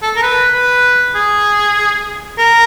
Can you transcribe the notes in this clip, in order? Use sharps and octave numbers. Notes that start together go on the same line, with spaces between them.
A4
A#4
B4
B4
G#4
A#4